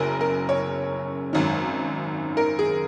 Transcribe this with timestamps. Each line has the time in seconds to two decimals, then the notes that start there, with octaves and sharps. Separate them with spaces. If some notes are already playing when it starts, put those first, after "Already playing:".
Already playing: F#1 F#2 C#3 A#4
0.21 A#4
0.49 C#5
1.33 G#1 F#2 D#3
2.37 A#4
2.59 G#4